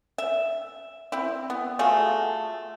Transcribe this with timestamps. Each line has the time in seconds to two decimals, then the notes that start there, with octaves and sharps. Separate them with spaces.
0.18 E5
1.12 C4 E4
1.50 B3
1.79 A3 F4 F#4 G#4